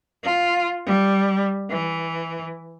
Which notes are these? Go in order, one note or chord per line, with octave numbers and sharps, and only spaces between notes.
F4
G3
E3